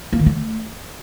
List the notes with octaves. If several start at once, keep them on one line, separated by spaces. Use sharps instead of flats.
A#3
D#3
A3